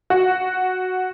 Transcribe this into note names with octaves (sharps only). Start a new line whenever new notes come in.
F#4